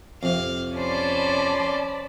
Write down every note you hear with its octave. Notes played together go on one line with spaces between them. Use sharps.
F2 C3 F5
C#4 C5 D5 A5 B5